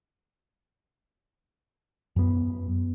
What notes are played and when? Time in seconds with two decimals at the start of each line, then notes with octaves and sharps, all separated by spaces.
2.16 F#2 B3